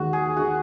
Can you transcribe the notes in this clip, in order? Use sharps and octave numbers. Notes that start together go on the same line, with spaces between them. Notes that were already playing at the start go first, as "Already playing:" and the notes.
Already playing: D#2 D#3 G#3 F#4
G#4
D#3 G#3 F#4